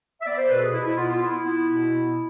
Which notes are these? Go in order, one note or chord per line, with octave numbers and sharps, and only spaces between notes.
E5
B3 D5
C5
B2 B4
A4
G#4
B2 E4
E4
B3 F4
F4
B3 E4
B3
B2
B3